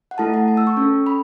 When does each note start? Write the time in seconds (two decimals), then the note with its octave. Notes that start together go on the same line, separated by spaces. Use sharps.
0.11 F#5
0.18 A3 E4 A4 A5
0.34 F#5
0.48 A5
0.57 E6
0.67 C#6
0.77 C#4 A4
1.06 B5